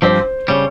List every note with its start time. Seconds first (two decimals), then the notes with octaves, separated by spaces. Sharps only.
0.02 G2 F3 C4 G4 C5
0.48 C#3 G3 C#5